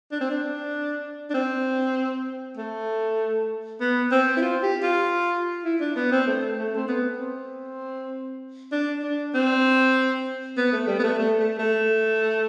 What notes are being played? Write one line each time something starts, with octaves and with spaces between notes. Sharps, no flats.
D4
C4
D4
D4
C4
A3
B3
C4
E4
F4
G4
F4
E4
D4
B3
C4
A3
A3
C4
B3
C4
D4
D4
C4
B3
A3
G3
B3
A3
A3
A3
A3